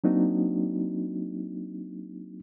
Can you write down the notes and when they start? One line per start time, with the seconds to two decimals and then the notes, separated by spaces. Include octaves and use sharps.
0.04 F#3 A#3 C4 D4 D#4 F#4